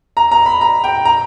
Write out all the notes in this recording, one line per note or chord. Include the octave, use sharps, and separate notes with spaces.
A#5
A#5
B5
A#5
G5
A#5